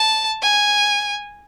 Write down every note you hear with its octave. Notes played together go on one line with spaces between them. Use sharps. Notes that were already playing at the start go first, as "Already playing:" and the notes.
Already playing: A5
G#5